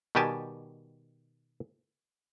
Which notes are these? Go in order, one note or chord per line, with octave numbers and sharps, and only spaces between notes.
B2 D#3 G3 G4 G#5 A5